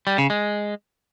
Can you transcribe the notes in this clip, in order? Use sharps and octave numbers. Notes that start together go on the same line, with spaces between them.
G3
C#3
G#3